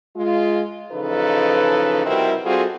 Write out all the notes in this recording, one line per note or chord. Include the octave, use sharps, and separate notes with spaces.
G#3 F4
C#3 E3 F3 D#4 A4 B4
C3 G3 C4 E4 F#4 A#4
G3 C4 F4 F#4 G#4 A4